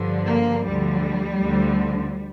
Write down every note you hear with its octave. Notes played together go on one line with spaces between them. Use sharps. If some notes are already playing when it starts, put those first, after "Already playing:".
Already playing: G2 D3 F3
A#3
D2 D3 F3 G3
D2 D3 F3